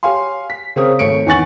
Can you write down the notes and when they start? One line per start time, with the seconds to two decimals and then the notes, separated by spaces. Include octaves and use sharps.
0.03 G4 C#5 F5 G#5 C6
0.50 B6
0.76 C#3 C4 A#4 C#5 D#6
0.99 G#1 A3 C#5 C#7 D7
1.26 E2 D#3 G#5 C#6 A6 F#7